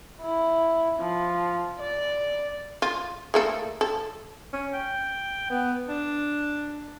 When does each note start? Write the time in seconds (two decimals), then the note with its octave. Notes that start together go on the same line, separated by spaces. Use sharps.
0.22 E4
1.00 F3
1.79 D5
2.82 F4
3.34 A3 A#3 A4
3.81 A4
4.53 C#4
4.74 G5
5.50 B3
5.89 D4